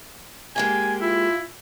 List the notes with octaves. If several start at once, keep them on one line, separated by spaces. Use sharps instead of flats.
G#3 A#3 G4 G#5
E4 F4